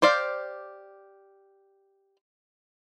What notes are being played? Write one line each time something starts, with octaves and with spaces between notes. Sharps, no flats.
G4 C5 D5 F5